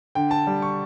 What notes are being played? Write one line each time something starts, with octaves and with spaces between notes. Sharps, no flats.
D3 G5
A5
G3
C#6